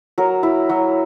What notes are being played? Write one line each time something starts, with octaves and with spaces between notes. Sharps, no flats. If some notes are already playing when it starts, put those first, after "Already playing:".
F#3 A#4
E4
F#3